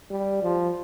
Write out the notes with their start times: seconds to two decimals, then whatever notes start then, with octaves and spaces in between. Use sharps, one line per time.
0.10 G3
0.43 F3